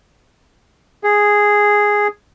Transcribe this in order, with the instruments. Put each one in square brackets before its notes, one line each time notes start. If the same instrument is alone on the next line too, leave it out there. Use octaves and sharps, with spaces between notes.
[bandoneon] G#4